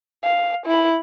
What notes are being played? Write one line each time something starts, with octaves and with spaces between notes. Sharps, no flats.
F5
E4 B5